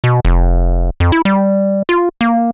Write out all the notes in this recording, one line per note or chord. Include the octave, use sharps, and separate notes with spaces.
B2
F1
F2
E4
G3
F4
A#3